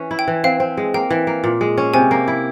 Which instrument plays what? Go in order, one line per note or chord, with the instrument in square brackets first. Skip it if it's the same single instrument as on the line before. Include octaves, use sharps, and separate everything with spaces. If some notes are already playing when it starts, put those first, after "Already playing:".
Already playing: [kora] E3 C#4
E4
[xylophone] G5
[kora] E3
[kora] C4 [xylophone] F5
[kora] C4
G#3
[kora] A#3 [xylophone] G5
[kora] E3
A#3
A#2
G#3
C#4
[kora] C3 [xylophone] G#5
[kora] A#3
E4